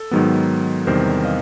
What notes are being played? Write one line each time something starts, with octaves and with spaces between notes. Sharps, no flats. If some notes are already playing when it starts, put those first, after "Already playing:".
Already playing: A4
G#2 D#3 F#3 B3
E2 C3 D#3 G3 A#4 C5
D#5 F5